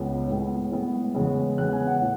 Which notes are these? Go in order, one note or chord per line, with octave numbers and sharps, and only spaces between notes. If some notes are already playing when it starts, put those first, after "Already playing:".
Already playing: C#2 C#3 G#3 B3
A2 G#3 B3
A2 G#3 B3
E2 C#3 G#3 B3
E2 C#3 G#3 B3 F#6
G#5
F#5
A2